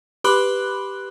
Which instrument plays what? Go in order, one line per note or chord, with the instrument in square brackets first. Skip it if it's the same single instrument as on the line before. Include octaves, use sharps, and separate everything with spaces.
[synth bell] G4 B4 B5 C6 D6 F#6